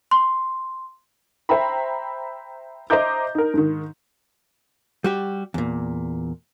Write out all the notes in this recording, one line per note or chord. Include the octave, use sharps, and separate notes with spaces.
C6
C5 E5 G5 A#5 B5
C5 D#5 E5 A#5 D6 G6
D#4 A#4
G#2 D#3
G3 F#4 G4
E2 A#2